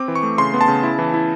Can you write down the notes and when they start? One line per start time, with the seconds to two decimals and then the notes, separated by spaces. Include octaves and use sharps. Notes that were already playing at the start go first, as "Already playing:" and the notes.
Already playing: C4 D6
0.08 E3
0.15 C#6
0.23 A3
0.38 C#3 C6
0.54 B3
0.61 A5
0.68 C#3
0.83 E4
0.98 E3
1.14 E4